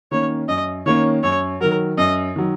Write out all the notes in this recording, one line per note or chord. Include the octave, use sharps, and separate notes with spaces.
D#3 A#3 C#4 C#5
F#2 D#5
D#3 A#3 C#4 C#5
F#2 C#5
D#3 F#3 A#4
F#2 D#5
D#3 F#3